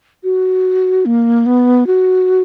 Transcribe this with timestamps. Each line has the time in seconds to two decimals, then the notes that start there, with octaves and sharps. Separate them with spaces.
0.24 F#4
1.06 A#3
1.46 B3
1.87 F#4